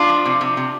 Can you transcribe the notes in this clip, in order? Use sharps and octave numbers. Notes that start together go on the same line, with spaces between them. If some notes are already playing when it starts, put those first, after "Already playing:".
Already playing: D4 F4
F3
C3
C3
C3